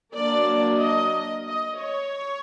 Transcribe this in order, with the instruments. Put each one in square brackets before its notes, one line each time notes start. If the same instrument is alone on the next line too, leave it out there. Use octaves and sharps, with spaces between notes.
[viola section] F#3 A#3 D4 D5
D#5
D#5
C#5